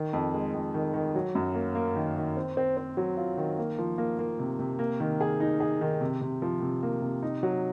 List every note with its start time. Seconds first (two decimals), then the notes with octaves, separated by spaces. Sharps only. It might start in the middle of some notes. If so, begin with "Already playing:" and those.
Already playing: D#3
0.13 F2
0.34 G#3
0.54 F2
0.74 D#3
0.94 D#3
1.15 F#3
1.35 F#2
1.55 A#3
1.75 A#3
1.96 D#3
2.17 D#3
2.37 C4
2.57 C4
2.77 C4
2.97 F#3
3.17 F4
3.37 D#3
3.58 A#3
3.78 F3
3.98 A#3
4.19 A#3
4.39 C3
4.59 C3
4.79 A#3
5.00 D#3
5.21 G#4
5.40 D#4
5.60 G#4
5.81 D#3
6.01 C3
6.21 C3
6.42 F3
6.62 C3
6.83 A#3
7.02 C3
7.23 D#4
7.43 F#3